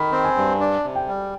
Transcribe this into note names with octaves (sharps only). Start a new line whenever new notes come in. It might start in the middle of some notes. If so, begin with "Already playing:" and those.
Already playing: D#3 B5
C4
G#5
G2
D4
C3
G5
G3